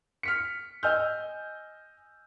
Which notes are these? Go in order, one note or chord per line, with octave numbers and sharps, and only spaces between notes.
F6 B6 C#7
D#5 G#5 E6 F6 G6